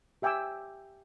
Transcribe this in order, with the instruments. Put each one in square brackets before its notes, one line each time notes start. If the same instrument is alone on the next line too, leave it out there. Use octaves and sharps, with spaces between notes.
[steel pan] G4 E5 G5 G#5 D6 E6